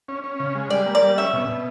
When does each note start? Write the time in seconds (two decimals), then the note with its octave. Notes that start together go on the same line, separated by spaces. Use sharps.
0.08 C#4
0.24 C#4
0.40 C#3
0.55 G#3
0.70 G3 D5
0.86 A#3
0.95 D5
1.02 G3
1.18 C#4 E5
1.33 B2
1.49 B2